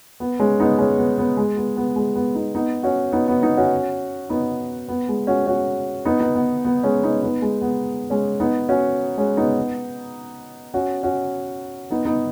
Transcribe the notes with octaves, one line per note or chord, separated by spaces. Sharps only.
B3
G#3 C#4
B3 D#4
G#3 C#4
B3
B3
G#3
B3
B3
G#3
B3
B3 D#4
B3 D#4
C#4 F#4
B3 D#4
B3
B3 D#4
C#4 F#4
B3 D#4
B3
G#3
C#4 F#4
C#4 F#4
B3 D#4
B3 D#4
B3
B3
G#3 C#4
B3 D#4
B3 D#4
G#3
B3
G#3 C#4
B3 D#4
C#4 F#4
G#3 C#4
B3 D#4
C#4 F#4
C#4 F#4
B3 D#4
B3 D#4